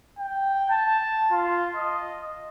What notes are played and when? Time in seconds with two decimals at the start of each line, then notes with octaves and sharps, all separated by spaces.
0.19 G5
0.70 A5
1.32 F4
1.76 D#5